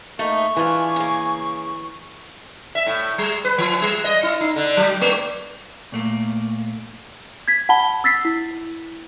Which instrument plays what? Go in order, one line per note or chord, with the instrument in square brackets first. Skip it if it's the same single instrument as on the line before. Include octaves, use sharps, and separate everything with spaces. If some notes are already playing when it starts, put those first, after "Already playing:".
[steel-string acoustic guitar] A3 D#4 [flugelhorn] A#3 [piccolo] C#6
[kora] E3 [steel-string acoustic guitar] G#3 D4 F4 [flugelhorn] G#5
[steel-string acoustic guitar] C#3 A#3
[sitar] E5
A2
G3
B4
E3
G3
D#5
E4
D#4
D3
F#3
A3
[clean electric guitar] A#2 A3 A#3
[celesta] G#6 B6
F#5 A5 B5 G7
E6 A6 B6 C7
E4